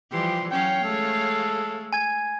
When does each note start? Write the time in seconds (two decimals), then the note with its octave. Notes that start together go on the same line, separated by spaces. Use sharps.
0.12 E3 F3 G3 G4 C6
0.51 F#3 C#4 C#5 F5 G5
0.84 G#3 A3 A4
1.93 G#5 G#6